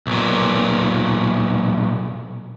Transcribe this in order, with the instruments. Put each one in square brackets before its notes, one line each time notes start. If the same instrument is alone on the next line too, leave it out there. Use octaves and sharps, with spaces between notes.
[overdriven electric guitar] B1 A#2